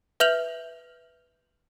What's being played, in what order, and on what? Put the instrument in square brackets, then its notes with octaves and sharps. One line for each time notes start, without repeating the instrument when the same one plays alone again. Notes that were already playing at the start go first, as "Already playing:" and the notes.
[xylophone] B4 E5 F6 G6 F7 F#7